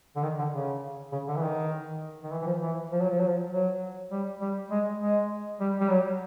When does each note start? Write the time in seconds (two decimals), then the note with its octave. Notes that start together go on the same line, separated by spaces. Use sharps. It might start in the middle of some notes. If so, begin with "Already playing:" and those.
0.16 D3
0.23 D#3
0.39 D3
0.53 C#3
1.12 C#3
1.28 D3
1.36 E3
1.43 D#3
2.24 D#3
2.32 E3
2.42 E3
2.47 F3
2.62 E3
2.92 F3
3.01 F#3
3.10 F3
3.20 F#3
3.28 F3
3.51 F#3
4.12 G3
4.41 G3
4.71 G#3
5.00 G#3
5.60 G3
5.80 G3
5.90 F#3